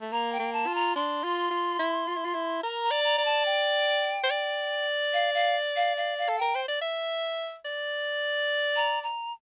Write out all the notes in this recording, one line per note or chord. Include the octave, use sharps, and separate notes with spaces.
A3
A#3 A#5
G5
A#3
A5
F4
A#5
D4 C6
F4
F4
E4
F4
E4
F4
E4
A#4 A#5
A#5
D5
A#5
D5
A5
G5
C5
D5
F5
F5
F5
F5
F5
A4
A#4 G5
C5
D5
E5
D5
A#5
A#5